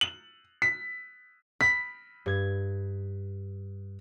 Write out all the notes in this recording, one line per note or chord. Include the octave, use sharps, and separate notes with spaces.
F#7
B6
B5 B6
G2 G#6